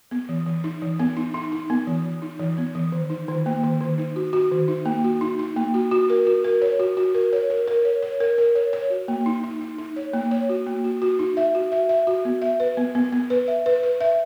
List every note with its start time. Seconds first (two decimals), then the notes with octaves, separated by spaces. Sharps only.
0.11 B3
0.29 E3
0.46 E3
0.64 D#4
0.82 E3
0.99 B3
1.17 D#4
1.34 D#4
1.52 D#4
1.70 B3
1.87 E3
2.05 E3
2.22 D#4
2.39 E3
2.58 B3
2.75 E3
2.92 D#3
3.10 D#4
3.28 D#3
3.46 A#3
3.64 D#3
3.81 D#3
3.98 D#4
4.16 F#4
4.33 F#4
4.51 D#3
4.68 D#4
4.86 A#3
5.04 F#4
5.21 D#4
5.39 D#4
5.56 A#3
5.74 F#4
5.91 F#4
6.10 A#4
6.27 F#4
6.44 A#4
6.62 C#5
6.80 F#4
6.97 F#4
7.15 A#4
7.33 C#5
7.50 A#4
7.67 A#4
7.85 C#5
8.03 C#5
8.20 A#4
8.38 A#4
8.55 C#5
8.73 C#5
8.90 F#4
9.08 A#3
9.26 D#4
9.44 D#4
9.61 D#4
9.79 D#4
9.96 C#5
10.13 A#3
10.31 C#5
10.49 F#4
10.67 A#3
10.84 F#4
11.02 F#4
11.19 D#4
11.37 E5
11.55 F#4
11.72 E5
11.89 E5
12.07 F#4
12.25 B3
12.42 E5
12.60 B4
12.77 B3
12.95 B3
13.12 B3
13.30 B4
13.48 E5
13.66 B4
13.83 B4
14.01 E5